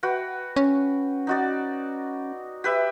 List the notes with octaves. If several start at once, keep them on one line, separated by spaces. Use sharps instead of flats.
F#4 B4 G5
C#4
D#4 F#4 D5
G4 B4 E5